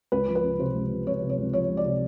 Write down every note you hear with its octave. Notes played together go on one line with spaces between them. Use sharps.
C#2 B4
F3
B4
C#2
C3 C5
C#2
F3
C#2 C#5
C3
C#5
C#2
F3 C#5
C#2
D5
C3